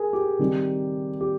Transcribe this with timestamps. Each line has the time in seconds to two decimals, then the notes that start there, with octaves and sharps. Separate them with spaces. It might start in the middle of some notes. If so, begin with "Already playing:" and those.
Already playing: G#4 A#4
0.13 G4
0.39 D#3 G3 C4 D#4
1.21 G4